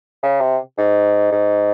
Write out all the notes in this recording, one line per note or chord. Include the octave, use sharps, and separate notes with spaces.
C#3
C3
G#2
G#2